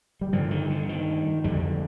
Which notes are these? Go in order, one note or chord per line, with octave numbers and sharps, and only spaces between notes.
G3
G2 D3 F3
D#3
D3
D#3
F2 D3 G3